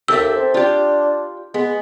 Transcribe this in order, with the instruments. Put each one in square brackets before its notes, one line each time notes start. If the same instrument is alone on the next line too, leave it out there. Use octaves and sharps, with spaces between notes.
[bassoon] D#2 [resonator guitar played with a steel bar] G4 A4 E5 [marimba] E6
[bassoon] C4
[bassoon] D4 [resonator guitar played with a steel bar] F4 G4
[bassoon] G#3 [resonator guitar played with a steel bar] B3